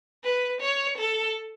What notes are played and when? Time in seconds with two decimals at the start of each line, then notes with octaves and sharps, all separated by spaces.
0.24 B4
0.61 C#5
0.98 A4